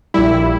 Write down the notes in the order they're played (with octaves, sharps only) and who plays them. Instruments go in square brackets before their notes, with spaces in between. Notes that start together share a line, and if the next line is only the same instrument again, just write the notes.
[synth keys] A#1 A#2 G3 E4